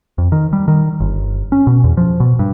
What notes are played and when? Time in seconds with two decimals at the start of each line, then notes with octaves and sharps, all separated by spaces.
0.18 F2
0.32 D#3
0.53 G3
0.68 D#3
1.00 G1
1.52 C#4
1.67 B2
1.84 E2
1.97 F3
2.20 B2
2.39 G2